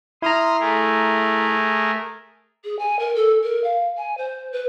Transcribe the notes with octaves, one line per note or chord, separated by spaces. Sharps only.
E4 A#5 C6 D#6 F6
A3 G#4 A#4
G#4
G#5
A#4
A4
A#4
F5
G#5
C5
B4